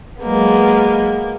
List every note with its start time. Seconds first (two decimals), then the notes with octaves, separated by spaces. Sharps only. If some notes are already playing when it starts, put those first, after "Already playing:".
0.21 F#3 G#3 A#3 B3